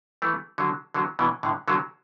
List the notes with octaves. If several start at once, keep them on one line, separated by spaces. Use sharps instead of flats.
E3 A3
D3 F#3
D3 F#3
B2 E3
A2 D3
D3 F#3